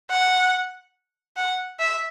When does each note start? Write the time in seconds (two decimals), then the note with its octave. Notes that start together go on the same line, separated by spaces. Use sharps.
0.10 F#5
1.37 F#5
1.79 E5